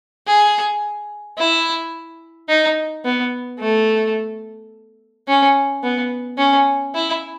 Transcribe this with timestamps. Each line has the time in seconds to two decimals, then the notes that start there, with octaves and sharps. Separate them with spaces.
0.27 G#4
1.38 E4
2.49 D#4
3.05 B3
3.60 A3
5.28 C#4
5.83 B3
6.38 C#4
6.95 E4